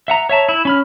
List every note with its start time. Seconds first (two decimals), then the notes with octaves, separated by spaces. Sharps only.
0.08 E5 F#5 A#5
0.29 C#5 E5 A5 A#5
0.49 E4
0.65 C#4 B5 F6